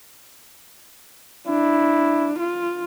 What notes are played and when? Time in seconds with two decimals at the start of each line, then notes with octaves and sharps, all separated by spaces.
1.47 D4 E4
2.39 F4